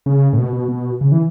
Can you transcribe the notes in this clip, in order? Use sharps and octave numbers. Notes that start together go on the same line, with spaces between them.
C#3
A2
B2
B2
B2
C#3
E3